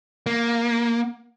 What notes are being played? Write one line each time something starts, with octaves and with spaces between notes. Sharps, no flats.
A#3